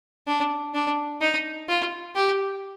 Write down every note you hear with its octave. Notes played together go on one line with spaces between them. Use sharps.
D4
D4
D#4
F4
G4